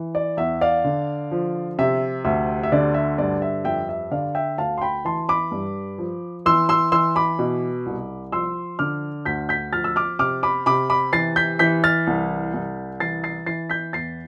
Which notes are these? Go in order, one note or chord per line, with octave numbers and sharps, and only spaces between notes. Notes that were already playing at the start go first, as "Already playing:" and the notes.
Already playing: E3
D5
E2 E5
D5 F5
D3
F3
C3 E5
D2 E5
E5
D3 D5
E5
G2 D5
E5
F2 E5 G5
E5
D3 D5 F5
E5 G5
D2 F5 A5
C6
G5 B5
E3 A5 C6
B5 D6
G2
F3
E3 C6 E6
C6 E6
E3 C6 E6
B5 D6
B2
C2
F3 C6 E6
D3 D6 F6
D2 G6 B6
G6 B6
F3 F6 A6
E6
D6 F6
C3 D6 F6
B5 D6
C3 B5 D6
B5 D6
E3 A6 C7
G6 B6
E3 G6 B6
F6 A6
C2
C2
E3 A6 C7
A6 C7
E3 A6 C7
G6 B6
E2 A6 C7